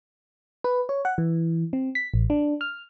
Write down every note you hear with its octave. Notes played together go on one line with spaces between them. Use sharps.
B4
C#5
F#5
E3
C4
B6
A1
D4
F6